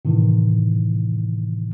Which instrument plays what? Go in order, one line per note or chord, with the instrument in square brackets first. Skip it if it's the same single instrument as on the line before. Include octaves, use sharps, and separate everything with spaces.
[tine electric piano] A2 C3 D#3 E3